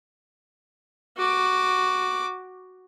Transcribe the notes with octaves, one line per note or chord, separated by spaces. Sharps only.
F#4 D6